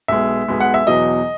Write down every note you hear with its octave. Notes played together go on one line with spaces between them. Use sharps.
B1 B2 G#3 E5
B1 B2 G#3
F#5
E5
E2 B2 F#3 D#5